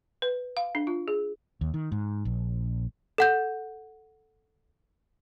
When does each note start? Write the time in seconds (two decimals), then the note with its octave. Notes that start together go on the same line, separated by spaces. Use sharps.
0.22 B4
0.57 F5
0.75 D4
0.87 F4
1.08 G#4
1.61 D#2
1.74 D#3
1.92 G#2
2.25 A#1
3.18 A4 F#5 G6